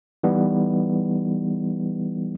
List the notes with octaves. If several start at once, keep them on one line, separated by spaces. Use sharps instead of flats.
E3 G3 B3 D#4